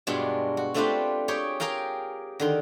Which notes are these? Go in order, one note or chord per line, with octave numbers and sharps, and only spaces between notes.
G2 B2 G#3 D4 F4
F#4
A3 C4 D4 F4 G4 B4
G4 G#4 C#5 G5 C6
G4 G#4 A#4 F5 G5
D3 D#3 C6